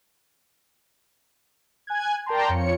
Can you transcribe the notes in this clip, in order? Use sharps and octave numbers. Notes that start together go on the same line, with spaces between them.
G#5 F#6 G#6
A#4 D5 G5 A5 A#5 C6
F2 F4 C#5 C#7